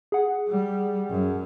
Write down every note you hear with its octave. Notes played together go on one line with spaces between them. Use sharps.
G#4 F#5
G3
F#2